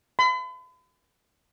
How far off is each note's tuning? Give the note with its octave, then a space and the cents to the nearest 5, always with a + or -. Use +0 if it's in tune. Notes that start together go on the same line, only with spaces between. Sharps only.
B5 +45